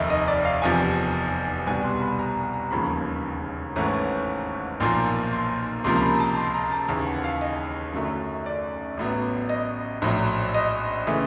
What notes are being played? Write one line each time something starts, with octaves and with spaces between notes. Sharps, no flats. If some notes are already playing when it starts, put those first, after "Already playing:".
Already playing: F1 D#2 D#3 D#5 E5
D#5
D5
F5
F1 E2 C3 F3 G#5
C2 B2 G3 G#5
C6
B5
A#5
A#5
E1 D#2 C#3 F3 A#3 B5
G#1 G#2 E3 A3 C#4
B1 A#2 F3 A#3 C6
C6
C#2 C3 F3 A#3 C6
A#5
B5
A5
C6
A#5
A5
D#2 C#3 E3 A5
F#5
F#5
F5
D#5
F#2 D3 F#3 A3
D5
A1 A2 F#3 B3
D#5
A#1 A2 F#3
D#5
C#3 E3 A3